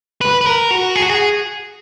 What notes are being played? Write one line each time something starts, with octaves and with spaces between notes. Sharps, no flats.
B4
B4
A#4
F#4
G#4
F#4
G#4